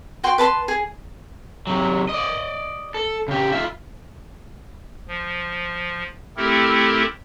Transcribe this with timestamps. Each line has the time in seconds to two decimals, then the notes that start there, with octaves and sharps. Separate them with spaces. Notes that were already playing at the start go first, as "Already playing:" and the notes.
0.24 F#4 F#5 G5 C6
0.38 B4 A5 B5 C6
0.68 G#4
1.67 C3 F#3
2.09 D5 D#5
2.94 A4
3.28 C#3 G4
3.52 F4 E5
5.08 F3
6.37 A3 C4 E4 G4 A4 A#4